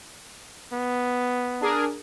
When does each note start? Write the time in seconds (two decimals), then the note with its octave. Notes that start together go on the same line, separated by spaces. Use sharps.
0.73 B3
1.61 D4 G#4 A#4